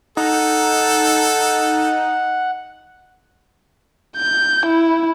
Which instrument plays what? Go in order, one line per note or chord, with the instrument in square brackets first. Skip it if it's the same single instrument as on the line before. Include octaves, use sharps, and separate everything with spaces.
[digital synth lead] D#4 [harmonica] A4 [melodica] F#5
[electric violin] G6
E4